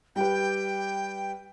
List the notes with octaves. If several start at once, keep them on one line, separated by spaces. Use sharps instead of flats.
G3 G4 B4 G5